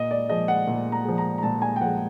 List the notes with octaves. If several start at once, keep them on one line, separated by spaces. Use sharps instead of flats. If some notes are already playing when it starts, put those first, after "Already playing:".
Already playing: A#2 D#5
D5
F3 G#3 D#5
F#5
A#2
A#5
F3 G#3
A#5
A#5
A#2 A5
G#5
G5
F3 G#3 F#5